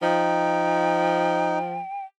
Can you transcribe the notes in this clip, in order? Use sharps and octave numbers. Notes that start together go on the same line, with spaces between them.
F3 D#4 G5